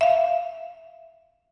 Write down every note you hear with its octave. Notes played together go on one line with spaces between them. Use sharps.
E5 F5